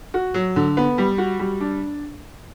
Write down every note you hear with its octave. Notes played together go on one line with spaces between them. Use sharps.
F#4
F#3
D3
B3
G3
F#4
G3
D4